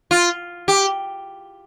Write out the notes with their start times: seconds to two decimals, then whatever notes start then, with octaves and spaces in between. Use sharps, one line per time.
0.11 F4
0.68 G4